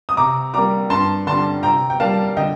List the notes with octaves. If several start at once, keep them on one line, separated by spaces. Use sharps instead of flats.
D#6
C3 A#5 D6
G3 A#3 A#5 D6
G2 A5 C6
D3 G3 A5 C6
C3 G5 A#5
G5
G3 A#3 F5 A5
D3 D#5 G5